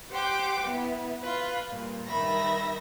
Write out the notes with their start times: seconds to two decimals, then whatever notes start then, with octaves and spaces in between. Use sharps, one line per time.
0.11 G4 C5 F#5 G5 D6
0.64 B3 E4
1.20 F4 B4
1.69 G2 A#2
2.07 G2 D#3 E5 B5 A#6